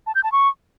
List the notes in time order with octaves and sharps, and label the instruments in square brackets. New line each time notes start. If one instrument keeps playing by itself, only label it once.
[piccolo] A5
G6
A5
C#6